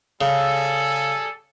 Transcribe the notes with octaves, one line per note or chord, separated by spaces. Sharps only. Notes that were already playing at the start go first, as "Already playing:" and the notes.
C#3 G3 G#4 A4